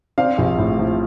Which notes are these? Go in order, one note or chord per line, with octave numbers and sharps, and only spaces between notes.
C4 D5 F5
A#1
A2
F3